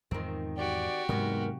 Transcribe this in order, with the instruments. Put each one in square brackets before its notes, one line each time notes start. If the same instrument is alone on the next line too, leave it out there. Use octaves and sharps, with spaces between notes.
[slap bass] E2 G#2 F3 [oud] D#3 C4
[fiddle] F#4 G4 [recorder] D5
[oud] E2 G#2 B3 [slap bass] C3 F#3 A#3 [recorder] A#4